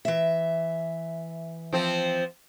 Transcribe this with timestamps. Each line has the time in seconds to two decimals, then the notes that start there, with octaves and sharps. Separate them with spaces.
0.05 E3 E5
1.73 F3 C4